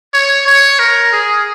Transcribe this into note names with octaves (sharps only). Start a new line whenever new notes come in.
C#5
C#5
A#4
G#4